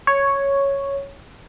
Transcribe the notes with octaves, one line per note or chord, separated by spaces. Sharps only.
C#5